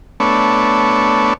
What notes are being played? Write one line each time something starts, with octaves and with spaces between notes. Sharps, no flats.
A3 B3 D4 C#5